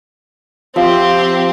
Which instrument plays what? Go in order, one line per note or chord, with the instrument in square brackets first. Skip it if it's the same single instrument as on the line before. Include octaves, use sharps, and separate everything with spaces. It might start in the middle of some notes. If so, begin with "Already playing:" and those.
[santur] F3 E5 [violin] C4 G4